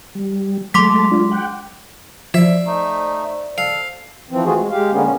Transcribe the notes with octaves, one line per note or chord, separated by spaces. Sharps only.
G3
F#3 G#3 A3 A5 C6 D6 B6
D4 F4
F#5 G5
F3 C5 D5 E5
A3 D#4
A4 F5
E3 F3 C4
A3 F4 F#4 G#4
G#3
G#3 G4 F5
D3 G#3 A#3 B3 C#4
A#2 C#4